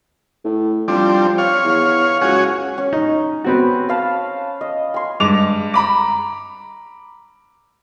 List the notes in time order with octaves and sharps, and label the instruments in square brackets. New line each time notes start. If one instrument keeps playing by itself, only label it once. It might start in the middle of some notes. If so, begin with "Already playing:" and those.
[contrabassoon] A2
[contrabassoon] F3 [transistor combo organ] G3 C4 D4
[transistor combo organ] C#5 F5
[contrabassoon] E2
[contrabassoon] C#2 [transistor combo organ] F#4 G#4 C#5
[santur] C#4
[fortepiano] D#4
B3 C4 F#4
[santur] B4 F5 A5
D#5
G#5 C6
[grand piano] G2 G#3 D6 F7
A#5 B5 D6